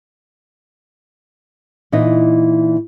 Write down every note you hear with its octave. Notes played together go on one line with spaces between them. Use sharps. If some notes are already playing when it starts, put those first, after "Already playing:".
A#2 E3 D#4 D#5